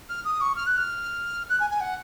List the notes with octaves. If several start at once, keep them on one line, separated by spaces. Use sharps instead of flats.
F6
D#6
C#6
F6
F#6
F6
F#6
G#5
G#5
F#5